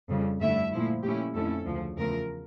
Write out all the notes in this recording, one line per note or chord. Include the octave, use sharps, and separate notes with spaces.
F2 C#3 G3
G2 D3 A3 E4 E5
A#2 F3 A3 E4
A#2 A3 C#4 E4 G4
F2 D3 A3 C#4 E4 A4
D2 C#3 F3
E2 C#3 F3 A3 A#4